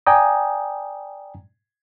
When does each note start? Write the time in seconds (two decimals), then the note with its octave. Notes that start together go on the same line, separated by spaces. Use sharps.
0.07 D5 G5 G#5 A#5 D#6